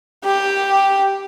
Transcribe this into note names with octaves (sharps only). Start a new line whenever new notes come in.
G4